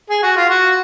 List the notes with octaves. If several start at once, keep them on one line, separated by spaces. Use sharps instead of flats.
G#4
F#4
F4
F#4